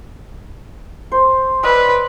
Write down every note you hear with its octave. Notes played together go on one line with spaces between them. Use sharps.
C5
B4 D5 D#5 E6